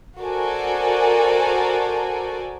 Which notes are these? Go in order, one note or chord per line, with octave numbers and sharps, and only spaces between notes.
F#4 A4 A#4 C5 D5 G#5